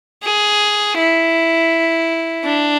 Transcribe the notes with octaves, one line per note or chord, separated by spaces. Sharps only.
G#4
E4
D4